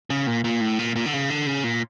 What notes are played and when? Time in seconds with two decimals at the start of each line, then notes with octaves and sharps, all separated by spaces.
0.10 C#3
0.27 A#2
0.44 A#2
0.61 A2
0.79 A#2
0.96 A#2
1.06 D3
1.13 C#3
1.30 D3
1.47 C#3
1.64 A#2